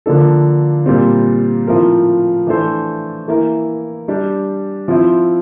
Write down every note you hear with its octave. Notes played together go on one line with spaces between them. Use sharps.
D3 F3 A#3 D4 A4
A#2 G3 C4
A2 F3 C4 F4 A#4
E3 A3 D4 A4 C5
E3 A#3 E4 A#4
G3 D4 G4
F3 C4 E4